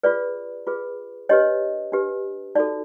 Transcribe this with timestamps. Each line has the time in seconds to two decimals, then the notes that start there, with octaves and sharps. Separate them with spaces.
0.03 F4 G#4 B4 D5
0.67 F4 G#4 B4
1.29 D4 G4 B4 C#5 D#5
1.92 D4 G4 B4
2.55 D#4 F#4 A4 D5